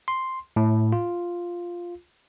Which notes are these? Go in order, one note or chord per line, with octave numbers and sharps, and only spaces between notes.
C6
A2
F4